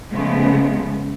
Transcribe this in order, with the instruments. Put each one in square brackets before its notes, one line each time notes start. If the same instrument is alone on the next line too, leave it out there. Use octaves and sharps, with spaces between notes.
[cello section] C#3 F3 G#3 A3 B3